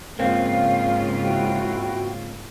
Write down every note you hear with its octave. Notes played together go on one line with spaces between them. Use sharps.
G#2 C#3 A#3 C4 F4 F5
E4 F#4 G5